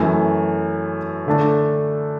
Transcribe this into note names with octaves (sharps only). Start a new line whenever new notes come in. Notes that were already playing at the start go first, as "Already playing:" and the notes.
Already playing: F#2 E3 A3
D3 A3 D4 A4